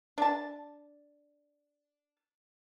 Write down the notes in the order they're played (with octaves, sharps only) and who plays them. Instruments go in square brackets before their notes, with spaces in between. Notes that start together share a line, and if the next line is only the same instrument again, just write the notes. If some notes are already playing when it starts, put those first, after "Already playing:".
[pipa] D4 A5